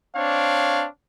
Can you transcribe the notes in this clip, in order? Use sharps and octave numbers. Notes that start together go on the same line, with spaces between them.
C4 D4 C#5 F5